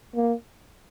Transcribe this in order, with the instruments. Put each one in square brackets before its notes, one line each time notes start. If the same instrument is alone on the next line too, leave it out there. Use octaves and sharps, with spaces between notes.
[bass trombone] A#3